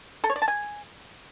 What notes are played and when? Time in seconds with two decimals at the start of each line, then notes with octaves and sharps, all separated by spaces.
0.24 A4
0.30 C#5
0.36 D5
0.42 A5
0.48 G#5